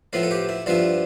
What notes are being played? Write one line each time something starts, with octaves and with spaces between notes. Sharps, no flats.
A2 F3 B3 E4 F4
A4
G4
E4
G2 F3 B3 E4 F4